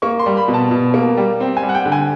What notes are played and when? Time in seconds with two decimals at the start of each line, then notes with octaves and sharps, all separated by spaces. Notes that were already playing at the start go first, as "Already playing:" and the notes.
0.02 A#3 C#6
0.19 C6
0.26 G3
0.37 B5
0.48 B2
0.54 A5
0.71 B2
0.94 A#3
1.17 G3
1.40 C4
1.57 G#5
1.63 G3
1.69 F#5
1.75 G5
1.85 D3
1.92 G#5